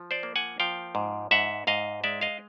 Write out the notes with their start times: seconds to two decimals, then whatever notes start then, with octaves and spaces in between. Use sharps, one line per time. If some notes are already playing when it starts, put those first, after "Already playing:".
Already playing: F3
0.11 C5 D5
0.23 A#3
0.36 F#5 G#5
0.60 F3 F5 G5
0.95 G#2
1.31 G#2 E5 F#5
1.67 G#2 D#5 F5
2.04 G#3 D5 E5
2.21 D#5 F5